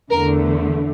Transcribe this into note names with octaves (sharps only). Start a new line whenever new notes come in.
E2 D3 A3 A#4